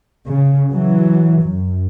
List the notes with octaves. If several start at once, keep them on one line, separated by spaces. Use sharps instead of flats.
C#3
E3 F#3
F#2